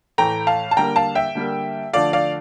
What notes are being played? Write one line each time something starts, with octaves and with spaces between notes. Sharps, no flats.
A2 E3 A3 G5 A#5
F5 A5
A5
D3 G3 A#3 G5 A#5
F5 A5
E5 G5
D3 G3 A#3
D3 F3 A3 D5 F5
D5 F5